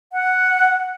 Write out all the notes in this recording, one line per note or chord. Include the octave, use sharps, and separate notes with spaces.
F#5